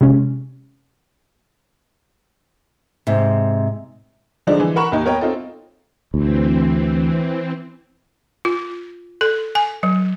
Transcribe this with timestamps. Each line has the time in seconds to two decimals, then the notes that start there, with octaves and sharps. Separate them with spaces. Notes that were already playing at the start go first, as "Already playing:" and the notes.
0.01 C3 G#3 C#4
3.07 G#2 C3
4.47 D3 F3 G#3 D4 D#4
4.60 E3
4.76 A#4 F#5 B5 C#6 E7
4.92 D#2 D#4
5.05 B3 A#4 C#5 D#5 G5
5.21 C4 D#4 F4 A4
6.14 D2 E3 C4
8.45 F4
9.21 A4
9.55 G#5
9.83 F#3